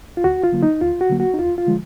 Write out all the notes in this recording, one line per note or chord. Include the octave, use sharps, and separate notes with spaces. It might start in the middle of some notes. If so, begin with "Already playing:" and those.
F4
D2 F#4
F4
D3 F#3 A#3
D#4
D2 F4
F#4
D3 F#3 A#3
F#4
D#4
D#2 F4
F4
D3 F3 G#3